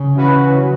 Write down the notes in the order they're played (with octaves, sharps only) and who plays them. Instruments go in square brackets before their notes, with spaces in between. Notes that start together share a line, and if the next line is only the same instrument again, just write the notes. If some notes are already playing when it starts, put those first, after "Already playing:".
Already playing: [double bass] C#3
[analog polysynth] E3 C#4 F#4 B4
F#3